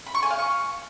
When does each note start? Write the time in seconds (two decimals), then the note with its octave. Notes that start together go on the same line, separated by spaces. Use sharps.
0.06 B5
0.15 C#6
0.23 G#5
0.31 F5
0.39 C#6